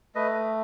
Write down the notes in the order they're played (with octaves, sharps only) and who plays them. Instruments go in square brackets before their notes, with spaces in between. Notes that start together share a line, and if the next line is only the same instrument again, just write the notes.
[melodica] A3 B4 D#5